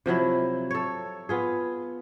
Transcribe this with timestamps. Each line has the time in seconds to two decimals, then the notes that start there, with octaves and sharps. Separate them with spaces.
0.06 C3 F3 F#3 E4
0.71 A4 C#5
1.29 B3 F4 G#4